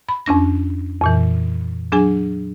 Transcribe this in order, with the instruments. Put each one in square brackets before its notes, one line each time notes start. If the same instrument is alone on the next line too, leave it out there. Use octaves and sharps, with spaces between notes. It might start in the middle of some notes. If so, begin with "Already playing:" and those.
[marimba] B5
F2 C#4 D4 A#6
F2 A#2 E3
F#3 D4 G#4 G#5